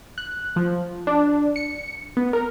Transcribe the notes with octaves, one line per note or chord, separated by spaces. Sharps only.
F#6
F3
D4
C#7
B3
A#4